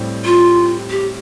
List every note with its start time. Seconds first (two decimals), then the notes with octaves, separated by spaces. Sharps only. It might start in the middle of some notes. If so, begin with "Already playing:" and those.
Already playing: A2 G3 C4
0.25 F4
0.90 G4